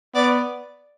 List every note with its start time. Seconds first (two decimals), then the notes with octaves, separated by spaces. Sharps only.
0.15 B3 D5